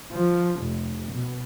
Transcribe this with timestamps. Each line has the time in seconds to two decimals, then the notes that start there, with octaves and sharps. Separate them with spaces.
0.15 F3
0.62 F1
1.12 B2